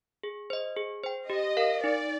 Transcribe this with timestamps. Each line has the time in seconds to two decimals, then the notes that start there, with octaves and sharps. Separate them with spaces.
0.23 G#4
0.50 C5 D#5
0.77 G#4
1.03 C5 G5
1.30 G4 D#5
1.57 A#4 F5
1.83 D#4 D5